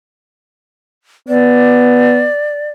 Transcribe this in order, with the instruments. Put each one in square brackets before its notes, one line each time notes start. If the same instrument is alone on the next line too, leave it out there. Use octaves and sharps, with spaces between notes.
[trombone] B3 [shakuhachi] D5